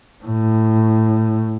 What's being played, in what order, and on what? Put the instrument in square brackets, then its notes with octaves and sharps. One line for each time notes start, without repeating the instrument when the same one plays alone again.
[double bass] A2